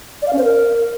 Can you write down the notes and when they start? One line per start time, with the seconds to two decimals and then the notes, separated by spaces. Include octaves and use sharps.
0.22 D5
0.28 F5
0.33 C#4
0.38 C5
0.44 A#4